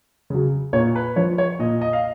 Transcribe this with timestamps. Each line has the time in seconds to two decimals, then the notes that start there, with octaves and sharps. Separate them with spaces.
0.30 C#3 F#3
0.73 A#2 C#5
0.95 B4
1.16 F3 C#5
1.38 C#5
1.59 A#2 D#5
1.81 D#5
1.93 F5